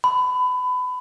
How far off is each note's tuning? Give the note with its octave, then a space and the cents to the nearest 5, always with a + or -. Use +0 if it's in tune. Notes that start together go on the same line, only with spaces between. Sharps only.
B5 +25